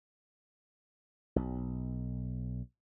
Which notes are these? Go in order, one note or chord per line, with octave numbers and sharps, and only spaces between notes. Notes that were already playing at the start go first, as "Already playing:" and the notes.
B1